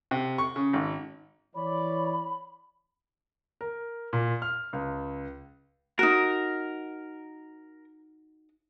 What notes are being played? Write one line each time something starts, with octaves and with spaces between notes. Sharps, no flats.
C3
C#6
C#3
G#1
E3 C#5 D5 B5
A#4
A#2
F6
C#2
D#4 F#4 A#4